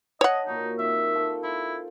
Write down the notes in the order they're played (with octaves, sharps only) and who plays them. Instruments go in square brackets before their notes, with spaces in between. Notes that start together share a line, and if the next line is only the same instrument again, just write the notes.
[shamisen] C#5 F#5 [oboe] D#5 [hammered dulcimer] A5
[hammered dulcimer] A#2 F#4 G4 [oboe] D#4
[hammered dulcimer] D#3 C4 [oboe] E5
[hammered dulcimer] F4 A4 G5
[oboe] E4 [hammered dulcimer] C5